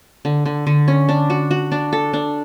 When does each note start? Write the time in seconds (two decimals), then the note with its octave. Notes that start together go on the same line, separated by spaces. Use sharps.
0.25 D3
0.46 D3
0.67 D3
0.88 C#4
1.09 D4
1.30 F#4
1.51 F#4
1.72 D4
1.93 A4
2.13 D4